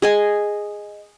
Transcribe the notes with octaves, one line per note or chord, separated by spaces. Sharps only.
G#4 D#5 G#5